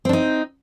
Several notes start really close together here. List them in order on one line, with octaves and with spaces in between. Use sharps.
C4 D4 D#4